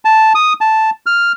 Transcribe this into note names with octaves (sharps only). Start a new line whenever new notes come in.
A5
D#6
A5
F6